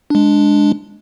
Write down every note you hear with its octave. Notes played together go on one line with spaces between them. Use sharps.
G#3 D4